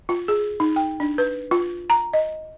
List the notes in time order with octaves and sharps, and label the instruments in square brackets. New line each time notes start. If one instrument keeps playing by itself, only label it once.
[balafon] F4
G#4
D#4
G5
D4
B4
F4
A#5
D#5